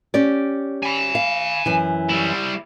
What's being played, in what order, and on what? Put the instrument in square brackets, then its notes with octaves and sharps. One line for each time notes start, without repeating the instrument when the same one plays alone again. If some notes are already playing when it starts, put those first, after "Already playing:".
[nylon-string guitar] C#4 G4 D5
[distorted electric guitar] G#5 B5
[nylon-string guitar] F5
F#2 E3
[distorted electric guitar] G3 E4